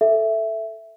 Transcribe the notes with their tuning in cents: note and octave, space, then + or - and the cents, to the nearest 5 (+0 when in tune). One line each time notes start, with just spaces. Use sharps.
A4 +0 E5 +5